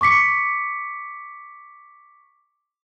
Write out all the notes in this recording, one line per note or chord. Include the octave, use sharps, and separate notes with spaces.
C#6 D6 B6 C#7